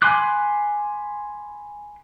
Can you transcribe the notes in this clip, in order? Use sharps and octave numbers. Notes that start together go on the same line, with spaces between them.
G#5 B5 C6 D6 F#6